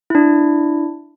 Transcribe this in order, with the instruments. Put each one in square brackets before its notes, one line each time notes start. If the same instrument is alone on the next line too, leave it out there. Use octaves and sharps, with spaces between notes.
[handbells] D4 E4